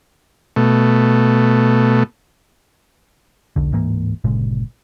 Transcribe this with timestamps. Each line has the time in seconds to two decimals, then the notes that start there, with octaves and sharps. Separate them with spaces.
0.56 B2 A3
3.56 E1 B1 D3
3.72 D1 G#2 E3 A#3
4.24 G1 A#2 C#3 G#3